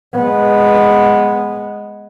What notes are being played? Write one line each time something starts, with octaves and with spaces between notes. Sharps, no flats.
G#3 B3